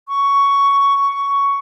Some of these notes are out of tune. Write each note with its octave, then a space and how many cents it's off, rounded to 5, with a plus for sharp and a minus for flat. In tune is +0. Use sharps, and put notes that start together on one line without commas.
C#6 +10